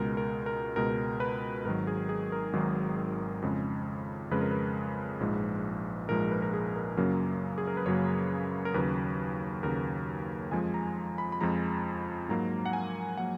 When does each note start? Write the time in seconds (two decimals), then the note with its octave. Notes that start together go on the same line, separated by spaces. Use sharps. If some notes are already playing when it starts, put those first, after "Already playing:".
Already playing: C#2 B2 G#3 A#4
0.17 A#4
0.46 A#4
0.76 C#2 B2 G#3 A#4
1.20 B4
1.65 G#1 G#2 D#3 F#3 A#4
1.87 G#4
2.09 G#4
2.32 A#4
2.53 G#1 G#2 D#3 F#3
3.42 F2 C#3 G#3
4.31 F2 C#3 G#3 B4
4.41 A#4
4.51 B4
5.20 A#1 G#2 F3 G#3
6.09 A#1 G#2 F3 G#3 A#4
6.31 B4
6.42 A#4
6.54 G#4
6.76 A#4
6.97 F#2 C#3 F#3 A#3 A#4
7.58 G#4
7.67 A#4
7.77 B4
7.86 F#2 C#3 F#3 A#3 C#5
8.65 A#4
8.74 D#2 C#3 F#3 B4
9.63 D#2 C#3 F#3 A#4
10.51 F2 F3 G#3 G#5
10.74 A#5
11.18 B5
11.32 B5
11.41 F2 F3 G#3 A#5
12.29 G#2 F#3 A#3 A#5
12.66 F#5
12.73 G#5
13.17 F#3 A#3 F#5